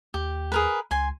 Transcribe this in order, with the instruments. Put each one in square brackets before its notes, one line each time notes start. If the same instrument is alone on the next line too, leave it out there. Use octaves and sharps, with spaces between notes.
[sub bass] D#2 [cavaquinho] G4
[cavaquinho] G#4 A#4 B4
[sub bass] C#2 [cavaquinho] G#5 C6